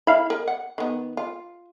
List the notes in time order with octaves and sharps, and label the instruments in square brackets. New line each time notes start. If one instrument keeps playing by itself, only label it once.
[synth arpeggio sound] E4 F5 [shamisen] B5
[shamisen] A#4 D#5
F#5
D#3 B3
F4